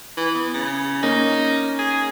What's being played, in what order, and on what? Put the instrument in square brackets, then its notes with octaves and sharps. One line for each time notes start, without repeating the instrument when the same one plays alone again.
[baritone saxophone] E3
B3
C#3
[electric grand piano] A#3 C#4 [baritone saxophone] D#4
[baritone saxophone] G#4